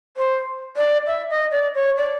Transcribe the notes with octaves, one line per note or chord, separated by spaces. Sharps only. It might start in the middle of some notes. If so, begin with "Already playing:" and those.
C5
D5
E5
D#5
D5
C#5
D5